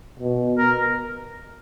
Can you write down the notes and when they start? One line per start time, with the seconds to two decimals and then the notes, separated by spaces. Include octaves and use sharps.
0.19 B2
0.58 A#4